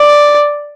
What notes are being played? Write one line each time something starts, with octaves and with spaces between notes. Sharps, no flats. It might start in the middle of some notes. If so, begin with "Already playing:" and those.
Already playing: D5